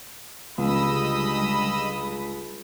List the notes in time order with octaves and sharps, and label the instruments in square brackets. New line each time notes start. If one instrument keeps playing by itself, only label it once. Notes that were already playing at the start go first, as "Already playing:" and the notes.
[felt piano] C#2 [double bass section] D3 G3 G#3 [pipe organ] D#5 D#6 E6 [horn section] B5